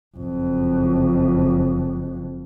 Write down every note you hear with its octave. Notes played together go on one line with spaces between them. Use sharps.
F#1 F2